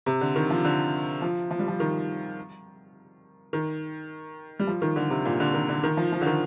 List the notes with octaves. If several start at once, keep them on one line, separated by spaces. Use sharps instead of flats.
C3
D3
D#3
F3
D3
F3
F3
G3
F3
D#3
D#3
G3
F3
D#3
D3
C3
A#2
D3
D#3
D3
D#3
F3
F3
D3
D#3